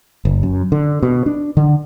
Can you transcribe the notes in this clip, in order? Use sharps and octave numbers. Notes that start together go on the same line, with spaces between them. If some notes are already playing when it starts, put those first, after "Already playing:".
F#1
F#2
D3
B2
D4
D3